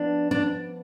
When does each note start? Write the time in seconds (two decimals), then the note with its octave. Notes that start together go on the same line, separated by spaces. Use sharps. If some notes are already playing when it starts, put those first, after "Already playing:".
Already playing: F3 B3 D4
0.31 D4